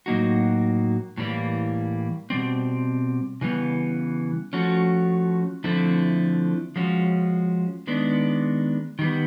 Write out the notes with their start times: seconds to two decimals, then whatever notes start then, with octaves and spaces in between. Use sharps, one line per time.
0.06 A2 F#3 A#3 D#4 F#4
1.17 A2 E3 G3 A#3
2.30 B2 G3 C4
3.41 C#3 E3 G3 B3
4.53 F3 A3 C#4 F#4
5.64 D3 F3 A3 C4 E4
6.76 F3 G#3 C#4 F#4
7.87 D#3 G#3 B3 D4
8.99 D#3 G3 B3